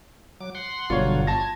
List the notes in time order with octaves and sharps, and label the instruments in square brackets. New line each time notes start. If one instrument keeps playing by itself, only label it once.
[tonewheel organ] F#3 D6
F#5 C6
[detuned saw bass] G1 [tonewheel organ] B2 D3 F#3 [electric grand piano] F4 C#5
[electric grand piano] A5 A#6 [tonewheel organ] G#6